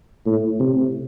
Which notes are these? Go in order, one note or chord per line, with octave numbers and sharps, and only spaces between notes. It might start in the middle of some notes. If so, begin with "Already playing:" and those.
A2
C3